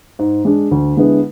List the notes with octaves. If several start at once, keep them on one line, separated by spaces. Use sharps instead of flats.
G#2
G#3 D4
D2
D3 G#3 B3 E4